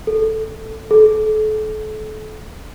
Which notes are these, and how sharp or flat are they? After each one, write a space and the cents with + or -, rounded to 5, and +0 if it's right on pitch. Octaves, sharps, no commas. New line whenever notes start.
A4 +0
A4 -35